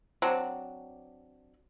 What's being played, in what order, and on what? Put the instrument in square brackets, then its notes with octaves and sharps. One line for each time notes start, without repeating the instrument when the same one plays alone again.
[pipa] F#3 C4 D4